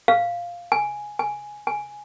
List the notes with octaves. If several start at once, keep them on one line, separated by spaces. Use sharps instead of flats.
F5
G#5
G#5
G#5